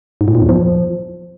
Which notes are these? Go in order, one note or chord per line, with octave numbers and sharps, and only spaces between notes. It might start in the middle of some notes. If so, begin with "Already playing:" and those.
G#2
A2
A#2
E2
F3